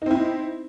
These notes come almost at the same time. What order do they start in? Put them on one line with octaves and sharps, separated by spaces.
D#4 C4 E4